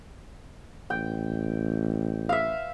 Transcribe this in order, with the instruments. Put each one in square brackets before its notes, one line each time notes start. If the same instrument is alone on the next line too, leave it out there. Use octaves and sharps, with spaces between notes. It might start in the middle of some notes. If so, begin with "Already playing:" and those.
[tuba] A1 [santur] G5
[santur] E5 F5